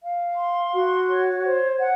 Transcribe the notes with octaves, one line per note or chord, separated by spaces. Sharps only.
F5
C6
F#4
C#5
C5
F#5